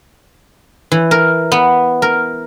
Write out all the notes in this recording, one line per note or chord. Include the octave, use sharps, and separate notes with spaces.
E3
A#4
B3
A#4